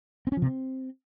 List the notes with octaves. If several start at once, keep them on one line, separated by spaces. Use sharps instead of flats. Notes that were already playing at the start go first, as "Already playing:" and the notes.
C4
C#4
F3
C3
C4